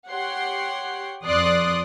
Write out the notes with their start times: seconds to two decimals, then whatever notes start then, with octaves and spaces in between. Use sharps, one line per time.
0.11 G4 C#5 F#5 G5 C6
1.24 F2 F3 D5 C6 D#6 F#6